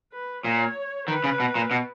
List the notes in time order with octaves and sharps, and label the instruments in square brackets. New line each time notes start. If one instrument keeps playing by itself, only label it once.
[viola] B4
[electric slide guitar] A#2 [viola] C#5
[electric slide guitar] D#3 [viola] B4
[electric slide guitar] C#3
B2
A#2
B2